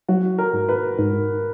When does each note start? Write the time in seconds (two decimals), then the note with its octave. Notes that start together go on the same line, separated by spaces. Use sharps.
0.09 F#3 F#4
0.38 A#4
0.53 G#2
0.69 B4
0.99 G#2